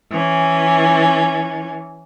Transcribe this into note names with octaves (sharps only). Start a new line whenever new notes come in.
E3 C#4